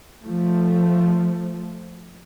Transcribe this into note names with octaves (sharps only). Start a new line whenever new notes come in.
F3 A3